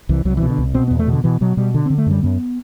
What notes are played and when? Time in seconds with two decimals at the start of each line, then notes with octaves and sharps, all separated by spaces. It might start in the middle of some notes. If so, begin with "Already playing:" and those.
0.09 C2 E3
0.25 C2 F#3
0.37 E3
0.41 B2
0.50 D3
0.58 C2
0.74 B2 C4
0.88 E2 B3
0.99 A3
1.07 B2
1.12 D3
1.24 B2 E3
1.41 B2 F#3
1.57 B2 G3
1.74 D3
1.86 C4
1.90 D3
1.98 A3
2.06 F#2 G3
2.23 F#2 B3